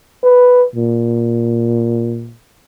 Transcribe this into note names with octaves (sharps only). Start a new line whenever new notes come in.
B4
A#2